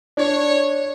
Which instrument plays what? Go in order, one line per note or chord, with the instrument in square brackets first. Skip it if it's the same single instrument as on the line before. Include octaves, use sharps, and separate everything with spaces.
[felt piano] D4 [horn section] C#5